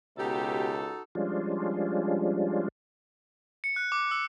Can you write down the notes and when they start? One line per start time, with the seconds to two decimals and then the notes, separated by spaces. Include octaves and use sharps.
0.18 C#2 B2 D#4 F#4 G4 A4
1.15 F3 G3 G#3 C#4 D4 F4
3.64 C#7
3.76 F#6
3.92 D6
4.11 E6